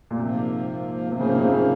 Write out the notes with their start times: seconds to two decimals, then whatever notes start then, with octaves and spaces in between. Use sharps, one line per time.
0.11 A#2
0.19 G#2 C3 F3 A#3
1.12 G#2 C3 F3 A#3
1.20 C#3
1.29 C3
1.36 C#3
1.44 C3
1.52 C#3